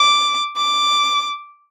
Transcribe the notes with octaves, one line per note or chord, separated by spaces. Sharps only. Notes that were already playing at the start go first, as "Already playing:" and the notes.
Already playing: D6
D6